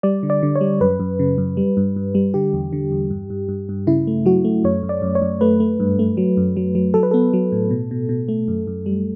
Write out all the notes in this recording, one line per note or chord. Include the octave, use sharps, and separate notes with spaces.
G3 D5
D3
D5
D3
C#5
G3
F#2 B4
F#2
C#3
F#2
G3
G2
G2
G3
D3 G4
E2
D3
E2
G2
G2
G2
G2
C#3 E4
A3
F#3 F#4
A3
F#2 C#5
F#2
D5
F#2
C#5
F#2
A3 B4
A3
G2
A3
F#3
F#2
F#3
F#3
F#3 A4
B4
B3 A4
F#3
A2
B2
B2
B2
A3
F#2
F#2
G3